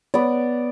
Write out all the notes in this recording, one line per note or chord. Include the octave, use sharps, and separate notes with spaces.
B3 D5